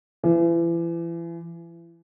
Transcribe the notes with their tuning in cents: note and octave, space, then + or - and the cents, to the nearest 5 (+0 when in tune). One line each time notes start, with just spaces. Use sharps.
E3 +35